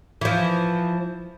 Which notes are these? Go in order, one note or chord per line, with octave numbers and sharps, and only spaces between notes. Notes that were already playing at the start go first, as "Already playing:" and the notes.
E3 F3